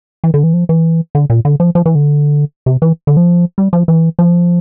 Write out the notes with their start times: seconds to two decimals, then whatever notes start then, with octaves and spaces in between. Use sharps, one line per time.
0.24 E3
0.34 D3
0.44 E3
0.54 F3
0.69 E3
1.15 D3
1.30 A#2
1.45 D3
1.60 F3
1.75 F3
1.86 E3
1.95 D3
2.66 C3
2.82 E3
3.07 D3
3.17 F3
3.58 G3
3.73 F3
3.88 E3
4.19 F3